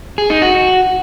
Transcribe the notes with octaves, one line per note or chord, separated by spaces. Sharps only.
G#4
D#4
F#4